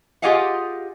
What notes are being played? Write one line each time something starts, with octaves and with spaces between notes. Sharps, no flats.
F4 G4 G#4 D#5 F5 F#5